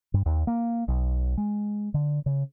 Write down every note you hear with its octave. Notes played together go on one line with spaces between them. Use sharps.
G2
D#2
A#3
B1
G#3
D3
C#3